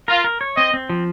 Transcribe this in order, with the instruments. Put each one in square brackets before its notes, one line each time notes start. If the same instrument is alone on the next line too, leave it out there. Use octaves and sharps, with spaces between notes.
[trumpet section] F4 [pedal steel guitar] A#4
[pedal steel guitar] A#4
C#5
[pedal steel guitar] C4 [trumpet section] D#5
[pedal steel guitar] C4
F3